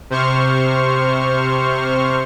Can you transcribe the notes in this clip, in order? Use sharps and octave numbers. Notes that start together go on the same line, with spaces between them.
C3 C5 C#6 F6